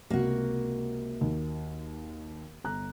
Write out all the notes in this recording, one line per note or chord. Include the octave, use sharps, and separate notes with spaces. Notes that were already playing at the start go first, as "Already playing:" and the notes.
C#2 C3 A#3 F#4
D#2
G1 A#5 F#6